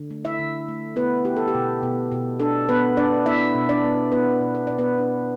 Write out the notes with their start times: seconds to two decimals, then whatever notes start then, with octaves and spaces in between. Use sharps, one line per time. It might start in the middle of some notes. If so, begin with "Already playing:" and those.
Already playing: D3
0.10 A3
0.24 E4 E5
0.39 D3
0.68 A3
0.96 B3 E4 B4
1.25 E4 G4
1.36 A4
1.48 G4
1.54 B2
1.83 B2
2.11 B2
2.40 D4 A4
2.69 B3 B4
2.97 D4 D5
3.26 B3 E4 E5
3.55 B2
3.69 D4 D5
3.84 B3
4.12 B3 E4 B4
4.41 B2
4.55 B4
4.67 B2 D5
4.78 B3 B4
4.98 D4